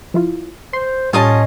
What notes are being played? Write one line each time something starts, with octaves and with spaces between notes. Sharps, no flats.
F3 E4 F4
C5 C6
A2 G3 C#4 F4 G4 D#5 A5 D#7